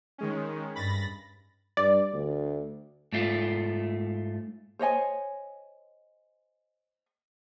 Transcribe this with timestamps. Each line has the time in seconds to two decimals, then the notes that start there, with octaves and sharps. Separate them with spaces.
0.18 D#3 G#3 C#4
0.76 G2 B5 A6 A#6
1.77 G2 D5
2.13 D2
3.13 G#2 A3 F4
4.79 C5 C#5 D#5 G#5